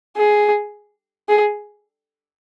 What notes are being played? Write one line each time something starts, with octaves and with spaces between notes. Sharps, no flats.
G#4
G#4